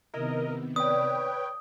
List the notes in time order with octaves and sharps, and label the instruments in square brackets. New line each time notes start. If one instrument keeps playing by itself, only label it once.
[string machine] C3 D#3 B3 [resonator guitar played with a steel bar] E4 [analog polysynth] A#4 D#5
[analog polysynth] B4 C#5 G5 [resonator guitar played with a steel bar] D5 [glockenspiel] D#6